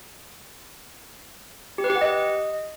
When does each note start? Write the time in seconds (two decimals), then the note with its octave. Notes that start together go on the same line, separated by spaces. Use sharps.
1.78 G4
1.84 B4
1.90 G4
1.96 F#5
2.01 D#5